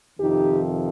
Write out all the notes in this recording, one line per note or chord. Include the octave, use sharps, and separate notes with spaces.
F2 C3 D#3 D#4 G4